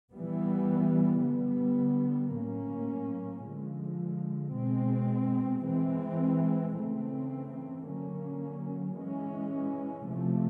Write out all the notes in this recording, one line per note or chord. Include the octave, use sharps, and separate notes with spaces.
E3 G3 B3
D3 G3 B3
A2 F#3 A#3 C#4
D3 F3 G#3
B2 G#3 C4
E3 G#3 C4
C#3 E3 A3 C4
D3 F#3 A#3 C#4
E3 G#3 C#4
C3 F3 A3